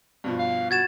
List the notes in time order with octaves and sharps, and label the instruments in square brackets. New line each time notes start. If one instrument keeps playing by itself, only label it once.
[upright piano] G2 B2 F3
[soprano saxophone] F5
[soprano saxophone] F#4 [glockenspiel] G#6 A6 E7